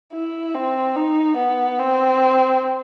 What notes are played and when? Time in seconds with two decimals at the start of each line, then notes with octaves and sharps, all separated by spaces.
0.13 E4
0.54 C4
0.96 D#4
1.36 B3
1.79 C4